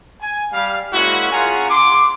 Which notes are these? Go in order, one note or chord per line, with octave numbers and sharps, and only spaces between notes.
G#5
G3 F5
G#3 A#3 C#4 E4 F#4
C#4 F4 G#4 F#5 G#5 A#5
C6 D6